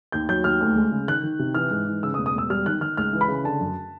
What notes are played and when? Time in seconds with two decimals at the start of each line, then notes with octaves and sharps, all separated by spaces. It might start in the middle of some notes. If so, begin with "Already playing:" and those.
0.12 D#2 G6
0.29 F#3 G6
0.44 D#2 F6
0.61 D2
0.76 G#3
0.92 C#3
1.08 D#3 F#6
1.23 D#3
1.39 C3
1.55 E3 F6
1.71 G#2
1.87 E3
2.03 C#3 E6
2.14 D#6
2.18 E1
2.26 D#6
2.34 E1 E6
2.50 G3 F6
2.66 D#3 F#6
2.81 D#3 F6
2.97 C#2 F6
3.13 E3
3.21 B5
3.28 C#3
3.44 D3 A5
3.60 F#2